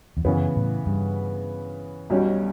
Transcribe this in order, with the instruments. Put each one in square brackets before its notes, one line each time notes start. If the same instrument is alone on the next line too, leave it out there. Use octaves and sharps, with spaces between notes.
[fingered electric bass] E2
[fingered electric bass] F#2 [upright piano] C#3 E3 B3
[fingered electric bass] A2
G2
[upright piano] B1 B2 G3 C#4